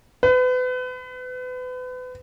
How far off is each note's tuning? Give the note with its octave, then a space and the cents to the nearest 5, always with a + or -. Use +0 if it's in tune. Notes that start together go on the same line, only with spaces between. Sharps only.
B4 +35